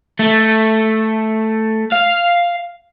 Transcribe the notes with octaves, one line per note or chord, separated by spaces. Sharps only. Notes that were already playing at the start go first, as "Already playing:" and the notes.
A3
F5